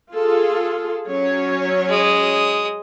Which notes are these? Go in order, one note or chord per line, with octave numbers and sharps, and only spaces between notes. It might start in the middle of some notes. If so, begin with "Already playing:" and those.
F4 G#4 A4
F#3 C#4 C#5
G#3 D#6